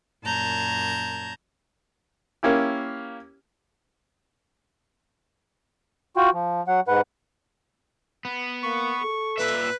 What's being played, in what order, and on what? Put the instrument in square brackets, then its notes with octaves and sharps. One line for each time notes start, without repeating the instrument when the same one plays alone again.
[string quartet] F#2 A#2 A5 A#5 G6 G#6
[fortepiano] A#3 C#4 E4 G4
[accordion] F4 F#4 G5
F3
F#3 F#5
G#2 B4 F#5
[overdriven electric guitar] B3
[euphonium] A#3 [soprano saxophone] C#6
[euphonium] A4
[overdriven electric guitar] A#2 E5 [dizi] B4